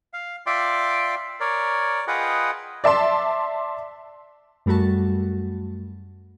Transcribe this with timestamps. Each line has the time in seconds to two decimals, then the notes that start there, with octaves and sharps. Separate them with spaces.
0.13 F5
0.47 F4 D5 E5 G5 C6 D6
1.40 A#4 C#5 D5
2.08 F4 G#4 B4 D#5 F#5 G5
2.84 D5 E5 A5 C6
4.66 F#2 G3 A3 F#4 A5